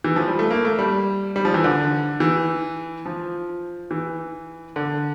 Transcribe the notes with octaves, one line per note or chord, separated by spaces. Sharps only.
E3
F3
G3
A3
A#3
A3
G3
G3
F3
E3
D3
E3
F3
E3
D3